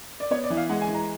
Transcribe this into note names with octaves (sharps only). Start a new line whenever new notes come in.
D5
B3 C#5
D5
E3
F5
G#3 F#5
G#5
E3
A#5